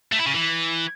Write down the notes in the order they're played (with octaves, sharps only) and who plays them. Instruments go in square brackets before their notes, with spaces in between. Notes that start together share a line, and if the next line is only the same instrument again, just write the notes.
[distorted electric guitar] A3
E4
C#3
E3